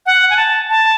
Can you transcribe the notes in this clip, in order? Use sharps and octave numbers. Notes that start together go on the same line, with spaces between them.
F#5
G#5
A5
A5